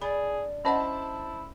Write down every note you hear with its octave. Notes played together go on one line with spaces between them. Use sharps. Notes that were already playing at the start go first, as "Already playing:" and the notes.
D4 G#4 B5
C#4 E4 C5 D#5 F#5 A5 B5